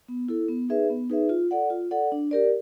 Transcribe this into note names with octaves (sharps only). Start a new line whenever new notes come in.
B3
E4 A4
B3
D#4 G#4 B4 E5
B3
D#4 G#4 B4 E5
F4
A4 D5 F#5
F4
A4 D5 F#5
D4
G4 A#4 D5